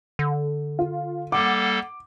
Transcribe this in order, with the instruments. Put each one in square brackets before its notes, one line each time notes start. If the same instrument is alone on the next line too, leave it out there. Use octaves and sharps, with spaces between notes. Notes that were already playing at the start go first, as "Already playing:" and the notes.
[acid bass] D3
[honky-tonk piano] F4
[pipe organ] G3 A#3 A4 [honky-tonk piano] F#5 [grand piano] D6